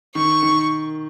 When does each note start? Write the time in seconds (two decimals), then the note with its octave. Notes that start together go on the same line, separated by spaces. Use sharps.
0.15 D#3 C#6
0.43 D#3